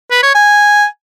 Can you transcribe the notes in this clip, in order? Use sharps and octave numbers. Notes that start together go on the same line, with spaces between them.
B4
C#5
G#5